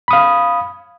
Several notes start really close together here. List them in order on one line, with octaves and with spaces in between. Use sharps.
B5 D#6 F5